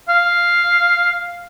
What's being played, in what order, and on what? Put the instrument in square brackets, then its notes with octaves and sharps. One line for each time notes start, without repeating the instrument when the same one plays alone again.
[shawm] F5